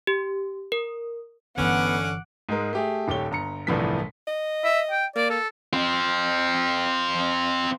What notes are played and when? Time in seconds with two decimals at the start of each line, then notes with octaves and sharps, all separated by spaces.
0.07 G4
0.72 A#4
1.58 G1 D3 E3 B3 C#4 F#5 D6
2.49 G#2 G#3 A#4
2.73 A3 G4 G#4
3.08 D#1 G4 A4 C#5 G7
3.31 G1 A#5 C#7
3.67 G1 C2 A2 E3 F3 B6
4.28 D#5
4.64 E5
4.91 G5
5.16 A#3 D5
5.30 A4
5.73 C4 F4